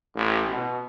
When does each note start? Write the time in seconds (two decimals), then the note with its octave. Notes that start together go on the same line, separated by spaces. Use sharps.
0.16 A1
0.50 B2